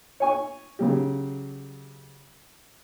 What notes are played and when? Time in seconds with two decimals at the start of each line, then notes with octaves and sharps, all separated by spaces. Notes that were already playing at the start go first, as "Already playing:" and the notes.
0.20 C#5 G#5 C#6
0.79 C#3 F#3 G4